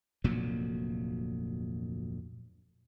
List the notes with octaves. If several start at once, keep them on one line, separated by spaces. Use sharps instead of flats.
F1 D2 A#2 F#3